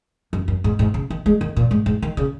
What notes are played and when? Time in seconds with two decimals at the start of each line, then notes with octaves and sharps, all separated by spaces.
0.33 F#2
0.48 F#2
0.64 G#2
0.79 G#2
0.94 C#3
1.10 D#3
1.26 G#3
1.41 D#3
1.57 A#2
1.71 G#2
1.86 G#2
2.02 D#3
2.17 C#3